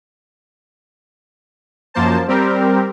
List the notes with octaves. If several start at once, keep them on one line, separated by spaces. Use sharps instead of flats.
F#2 F3 A#3 C5 A5
G3 C4 G4 A#4